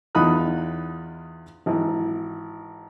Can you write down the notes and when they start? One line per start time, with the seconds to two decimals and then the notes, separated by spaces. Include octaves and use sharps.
0.15 E2 D#4 F4 B5 D#6 F#6
1.66 G#1 E3